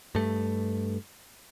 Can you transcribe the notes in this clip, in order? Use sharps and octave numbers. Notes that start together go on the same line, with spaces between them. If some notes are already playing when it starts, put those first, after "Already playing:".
G2 A3